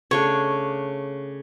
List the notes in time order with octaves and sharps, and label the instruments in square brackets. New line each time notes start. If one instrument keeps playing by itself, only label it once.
[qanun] C#3 A3 D4 [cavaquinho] C#5